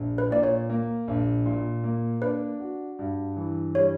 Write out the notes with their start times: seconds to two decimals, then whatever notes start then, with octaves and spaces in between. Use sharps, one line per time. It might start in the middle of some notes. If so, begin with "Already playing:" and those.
Already playing: A#1
0.18 B4
0.31 A#2 D5
0.43 C#5
0.70 A#3
1.08 A#1
1.45 A#2
1.84 A#3
2.22 D4 B4
2.60 F#4
2.99 G2
3.36 E3
3.75 G3 C#5